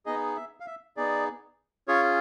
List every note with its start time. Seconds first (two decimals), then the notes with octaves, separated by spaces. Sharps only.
0.06 B3 D#4 G#4 D#5
0.36 E5
0.60 F5
0.66 E5
0.97 B3 D#4 G#4 D5
1.88 C#4 F4 G#4 C#5